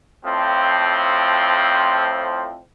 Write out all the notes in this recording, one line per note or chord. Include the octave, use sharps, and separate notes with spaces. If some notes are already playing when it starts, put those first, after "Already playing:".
F2 A2 F3 C4